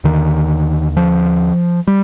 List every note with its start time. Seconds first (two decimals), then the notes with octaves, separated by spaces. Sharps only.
0.04 D#2 D3 D#3
0.97 F3
1.87 G3